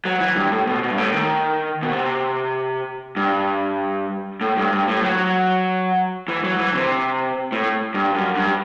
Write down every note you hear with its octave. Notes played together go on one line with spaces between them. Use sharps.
F#3
E3
G2
A2
B2
B2
G2
A2
D#3
B2
C3
G2
A2
G2
G2
A2
F#3
E3
F#3
E3
C3
A2
G2
F#2
G2